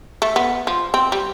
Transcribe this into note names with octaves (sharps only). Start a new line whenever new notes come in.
A3
B3
F3
C4
G3